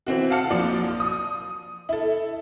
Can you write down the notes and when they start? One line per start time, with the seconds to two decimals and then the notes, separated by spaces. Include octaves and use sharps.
0.07 E3 C4 F#4
0.30 F5 F#5 A5 F6 C#7
0.50 A#1 F3 F#3 A#3 D5
1.00 D#6
1.89 E4 A4